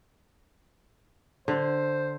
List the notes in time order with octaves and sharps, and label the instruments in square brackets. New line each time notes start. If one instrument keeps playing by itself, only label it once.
[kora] D3 [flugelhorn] C5